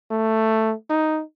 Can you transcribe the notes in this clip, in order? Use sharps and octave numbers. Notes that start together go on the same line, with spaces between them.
A3
D#4